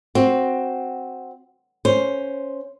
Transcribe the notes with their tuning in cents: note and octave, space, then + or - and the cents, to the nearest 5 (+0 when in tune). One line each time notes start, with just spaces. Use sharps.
C4 +5 F#4 +5
C#4 +0 C5 +0